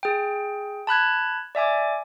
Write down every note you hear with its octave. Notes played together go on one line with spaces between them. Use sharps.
G#4 G5
A5 B5 F#6 G#6
D5 E5 G#5 D6